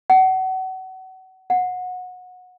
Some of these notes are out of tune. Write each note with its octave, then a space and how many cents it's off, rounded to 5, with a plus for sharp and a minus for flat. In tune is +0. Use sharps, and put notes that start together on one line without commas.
F#5 +30
F#5 -20